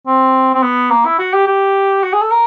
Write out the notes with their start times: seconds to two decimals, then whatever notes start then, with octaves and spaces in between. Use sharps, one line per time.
0.07 C4
0.54 C4
0.63 B3
0.91 A#3
1.05 E4
1.19 F#4
1.33 G4
1.47 G4
2.03 F#4
2.13 G#4
2.22 A4
2.31 A#4